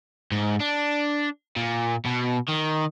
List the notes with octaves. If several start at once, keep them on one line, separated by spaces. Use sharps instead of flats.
G#2
D4
A#2
B2
D#3